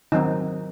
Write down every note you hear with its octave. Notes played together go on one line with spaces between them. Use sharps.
D#3 F#3 C4 D#4